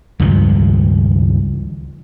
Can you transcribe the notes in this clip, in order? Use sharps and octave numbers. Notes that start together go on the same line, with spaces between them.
C#2 G2 D#3 F3